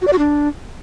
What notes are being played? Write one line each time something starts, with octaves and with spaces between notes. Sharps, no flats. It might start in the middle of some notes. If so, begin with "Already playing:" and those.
F#4
D5
F#4
D4